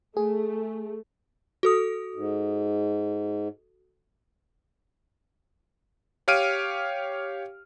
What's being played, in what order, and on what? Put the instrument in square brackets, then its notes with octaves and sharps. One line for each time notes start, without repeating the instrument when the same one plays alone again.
[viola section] A3 [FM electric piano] G#4
[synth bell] F#4 A4 D#6
[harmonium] G#2
[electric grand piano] G4 C#5 F5 F6 D7 D#7